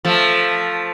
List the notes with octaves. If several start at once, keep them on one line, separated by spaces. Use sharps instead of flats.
F3 A3